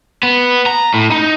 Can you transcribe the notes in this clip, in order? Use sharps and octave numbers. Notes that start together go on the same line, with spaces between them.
B3
A#5
A2
D#4